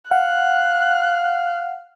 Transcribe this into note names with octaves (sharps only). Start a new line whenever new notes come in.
F5 F#5 F#6